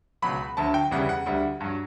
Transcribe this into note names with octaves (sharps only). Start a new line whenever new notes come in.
C#2 B2 F#3 B5
D2 D3 F#3 A5
G5
E2 C#3 E3 G3 F#5
F#5
D2 D3 G3
G2 F#3